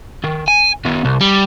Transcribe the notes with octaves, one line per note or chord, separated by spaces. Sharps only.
D#3
G#5
D#3 B3
C2
G3